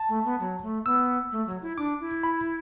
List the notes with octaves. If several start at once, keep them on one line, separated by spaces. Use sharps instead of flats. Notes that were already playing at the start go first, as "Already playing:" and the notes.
Already playing: A5
A3
B3
F#3
A3
B3 E6
A3
F#3
E4
D4 D6
E4
B5